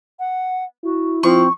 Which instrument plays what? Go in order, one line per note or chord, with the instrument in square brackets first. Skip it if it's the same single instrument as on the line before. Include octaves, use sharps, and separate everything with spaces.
[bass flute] F#5
[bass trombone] E4 [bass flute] F#4
[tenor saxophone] F3 [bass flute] C4 [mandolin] C#6